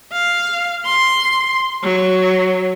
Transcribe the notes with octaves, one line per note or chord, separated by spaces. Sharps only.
F5
C6
F#3